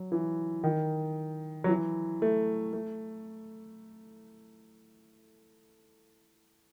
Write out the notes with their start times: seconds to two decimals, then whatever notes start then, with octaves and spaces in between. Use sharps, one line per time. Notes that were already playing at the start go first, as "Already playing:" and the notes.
Already playing: F#3
0.12 E3
0.64 D#3
1.64 F#3
1.69 E3
2.22 A3
2.73 A3